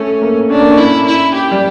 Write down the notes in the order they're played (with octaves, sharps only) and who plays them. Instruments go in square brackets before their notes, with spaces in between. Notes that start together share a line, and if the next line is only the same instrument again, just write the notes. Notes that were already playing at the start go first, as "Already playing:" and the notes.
Already playing: [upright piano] A3 [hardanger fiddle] C#4
[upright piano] A#3
[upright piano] C#4 [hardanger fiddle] D4
[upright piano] A#3
C#4
[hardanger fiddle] E4
E4
G4
[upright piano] G3